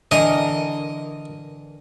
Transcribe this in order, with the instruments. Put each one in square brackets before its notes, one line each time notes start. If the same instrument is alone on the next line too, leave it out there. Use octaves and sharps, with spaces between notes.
[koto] D3 E3 A#4 [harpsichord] D#5